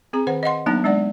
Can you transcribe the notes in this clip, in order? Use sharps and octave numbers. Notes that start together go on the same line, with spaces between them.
C4 G#4 A#5
D#3 C5 F#5
D#5 F5 F#5 C6
F#3 A#3 B3 D4 D#4 A5
G#3 D4 D5 F#5